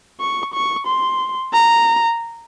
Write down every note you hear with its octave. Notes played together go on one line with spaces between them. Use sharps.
C#6
C#6
C6
A#5